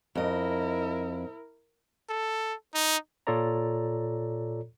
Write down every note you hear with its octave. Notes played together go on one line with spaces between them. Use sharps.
F2 E4 A#4 D#5
A4
D#4
A#2 F4 A4 C#5 D5 A#5